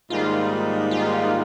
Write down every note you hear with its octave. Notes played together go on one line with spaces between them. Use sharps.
G#2 D#3 G3 A#3 D#4 F4
F4